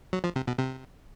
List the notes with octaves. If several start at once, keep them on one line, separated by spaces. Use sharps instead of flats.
F#3
F3
C3
B2
C3